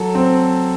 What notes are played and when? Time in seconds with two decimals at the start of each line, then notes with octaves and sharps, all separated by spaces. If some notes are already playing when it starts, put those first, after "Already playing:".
Already playing: F#3 A4
0.15 C4